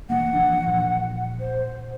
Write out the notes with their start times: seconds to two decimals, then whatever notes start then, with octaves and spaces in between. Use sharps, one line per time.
0.10 B2 E3 A#3 F#5
0.33 E3 F3 D4
0.66 A#2 F3
1.40 C5